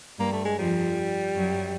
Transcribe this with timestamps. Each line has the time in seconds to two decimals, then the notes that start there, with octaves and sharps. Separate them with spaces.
0.19 G2 G3 A#3
0.33 A3
0.45 G#3
0.59 F2 F3 G3
1.36 F#2 F#3